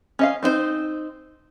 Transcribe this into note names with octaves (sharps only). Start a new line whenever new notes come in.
C#4 D#5 F5
C4 D#4 E4 C5